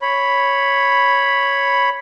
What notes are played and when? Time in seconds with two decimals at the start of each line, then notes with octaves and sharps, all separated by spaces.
0.02 C#5 B5